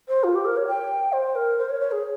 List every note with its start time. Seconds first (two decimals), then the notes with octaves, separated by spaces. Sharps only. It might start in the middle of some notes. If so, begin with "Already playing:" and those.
0.09 C5
0.24 F4
0.35 G4
0.45 A#4
0.57 C#5
0.68 G5
1.13 C5
1.35 A#4
1.59 C5
1.70 C#5
1.81 C#5
1.91 G#4